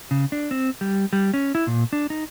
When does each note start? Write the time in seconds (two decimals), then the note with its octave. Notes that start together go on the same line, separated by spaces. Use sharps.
0.11 C#3
0.32 D4
0.51 C4
0.81 G3
1.13 G3
1.34 C#4
1.55 E4
1.67 A#2
1.93 D4
2.10 D#4